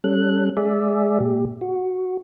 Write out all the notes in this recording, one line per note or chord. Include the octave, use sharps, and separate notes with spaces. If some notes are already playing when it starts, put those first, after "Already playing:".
G3 C#4 A4 F#6
G#3 G#4 D5 E5
A#2 G4
F#4